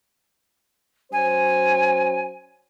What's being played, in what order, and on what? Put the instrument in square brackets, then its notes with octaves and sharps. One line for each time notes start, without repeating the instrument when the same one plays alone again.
[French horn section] F#3 C#4 C5 [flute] G#5